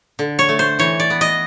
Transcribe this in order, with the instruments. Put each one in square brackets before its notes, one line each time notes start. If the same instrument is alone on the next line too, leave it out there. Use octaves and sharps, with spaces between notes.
[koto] D3
C#5
A3
C5
E3 C#5
D5
B3
D#5